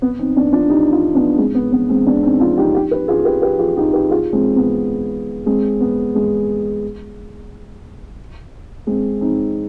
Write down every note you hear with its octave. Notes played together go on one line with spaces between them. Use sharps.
B3
C4 D#4
B3 D4
D4 F4
D#4 G4
D4 F4
B3 D4
G#3 C4
B3
B3
G#3 C4
B3 D4
C4 D#4
D4 F4
D#4 G4
D#4 G4
G4 B4
F4 G#4
G4 B4
G4 B4
F4 G#4
D#4 G4
G4 B4
F4 G#4
G#3 C4
B3
G#3 C4
B3
G#3
G#3 C4
C4 D#4